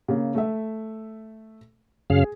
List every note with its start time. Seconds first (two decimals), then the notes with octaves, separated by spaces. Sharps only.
0.08 C#3 A#3
0.35 A3 E5
2.10 F#2 C#3 G#4 F5